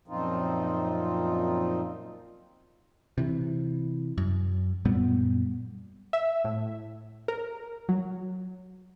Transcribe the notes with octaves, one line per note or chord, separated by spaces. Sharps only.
F#2 A#2 F3 C4 D#4 F4
C3 E3
F#2
F#2 A#2 G3 B3
E5
A2
A#4
F#3